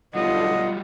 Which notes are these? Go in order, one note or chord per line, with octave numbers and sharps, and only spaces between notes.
B1 D3 F#3 G3 F4 D#5 F#5